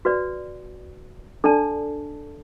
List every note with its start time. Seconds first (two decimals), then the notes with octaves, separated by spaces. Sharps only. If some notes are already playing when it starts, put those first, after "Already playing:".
0.05 F#4 B4 D5
1.44 D4 A4 D5 A5